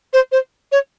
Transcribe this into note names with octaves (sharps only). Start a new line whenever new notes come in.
C5
C5
C#5